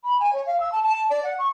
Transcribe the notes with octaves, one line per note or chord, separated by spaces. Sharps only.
B5
G#5
C#5
F5
E6
A5
A5
D5
F#5
C#6